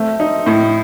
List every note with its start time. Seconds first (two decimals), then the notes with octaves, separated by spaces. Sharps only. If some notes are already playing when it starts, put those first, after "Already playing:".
Already playing: A3 C4
0.20 D#4
0.46 A2